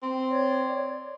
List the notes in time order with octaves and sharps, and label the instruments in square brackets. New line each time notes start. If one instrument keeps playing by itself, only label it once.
[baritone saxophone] C4
[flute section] C#5 D5